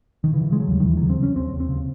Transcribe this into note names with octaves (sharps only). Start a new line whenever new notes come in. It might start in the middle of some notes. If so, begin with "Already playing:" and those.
D#3
C#3 E3
C#3 G#3
F#3
D#2
D#3
D#2 E3
F#3
C#3
C4
C#3 C#4
D#2 C4
D#2
C4
C#3